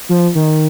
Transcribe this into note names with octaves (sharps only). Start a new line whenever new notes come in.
F3
D#3